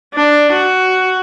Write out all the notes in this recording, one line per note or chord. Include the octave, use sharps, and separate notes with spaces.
D4
F#4